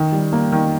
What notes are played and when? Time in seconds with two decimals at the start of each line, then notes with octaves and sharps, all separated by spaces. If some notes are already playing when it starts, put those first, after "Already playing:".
Already playing: D#3
0.12 G3
0.33 A#3
0.52 D#3